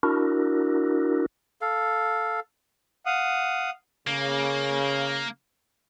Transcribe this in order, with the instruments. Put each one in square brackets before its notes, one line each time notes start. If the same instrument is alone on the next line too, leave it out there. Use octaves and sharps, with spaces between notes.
[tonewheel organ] D4 E4 F#4 A#4
[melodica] A4 F5
[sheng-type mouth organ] F5 F#5 D#6
[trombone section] C#3 [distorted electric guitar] A#3